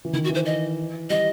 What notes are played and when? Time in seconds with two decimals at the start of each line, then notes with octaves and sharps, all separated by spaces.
0.05 E3
0.13 D#3 E4
0.24 F#4
0.29 E3
0.35 C5
0.46 D#5
1.10 G3 D#5